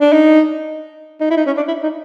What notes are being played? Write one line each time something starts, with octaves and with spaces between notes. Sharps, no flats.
D4
D#4
D#4
E4
D#4
C#4
D4
E4
D#4